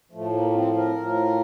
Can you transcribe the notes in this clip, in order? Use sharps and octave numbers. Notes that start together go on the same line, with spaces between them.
A2 F3 A3
A#3
C4
A#4
A2 F3